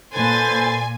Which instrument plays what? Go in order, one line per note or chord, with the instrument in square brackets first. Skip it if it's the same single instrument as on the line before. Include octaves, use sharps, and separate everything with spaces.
[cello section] A#2 [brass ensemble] A4 B4 C5 [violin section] G#5 [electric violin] C6 A6